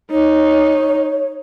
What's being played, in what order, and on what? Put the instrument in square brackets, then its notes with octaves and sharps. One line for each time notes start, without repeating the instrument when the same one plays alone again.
[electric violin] D#4 [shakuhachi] C#5